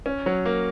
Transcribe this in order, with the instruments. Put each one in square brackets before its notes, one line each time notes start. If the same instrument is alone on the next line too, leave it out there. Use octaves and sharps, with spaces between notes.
[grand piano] C#4
F#3
A#3